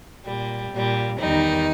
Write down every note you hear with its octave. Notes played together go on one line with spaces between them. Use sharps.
A#2 G3
A#2 G3
E2 D#3 G3 D#4